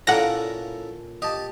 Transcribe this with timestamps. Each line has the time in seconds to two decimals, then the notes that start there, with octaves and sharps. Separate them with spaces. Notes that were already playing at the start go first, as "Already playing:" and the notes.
0.07 A#2 C#4 E4 A4 A#4 F#5 A#6
1.22 G4 D#5 A5